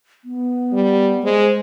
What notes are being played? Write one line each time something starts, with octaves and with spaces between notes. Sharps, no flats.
B3
G3
G#3 C5